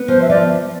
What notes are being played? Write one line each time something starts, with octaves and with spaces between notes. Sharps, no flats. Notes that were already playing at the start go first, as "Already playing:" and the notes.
Already playing: B3
F3 C5
E5
F3 D5